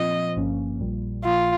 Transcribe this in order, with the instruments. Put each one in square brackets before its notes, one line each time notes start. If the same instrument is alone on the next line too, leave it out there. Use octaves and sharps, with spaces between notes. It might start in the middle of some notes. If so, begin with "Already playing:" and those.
Already playing: [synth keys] A#2 F3 C4 F4 [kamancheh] D#5
[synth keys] G1 G2 F3 A#3 C#4
A#1 A#2 G3
[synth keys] A#1 A#2 F3 A#3 [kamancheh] F4